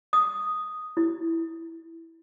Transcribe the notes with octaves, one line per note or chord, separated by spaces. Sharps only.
D#6
E4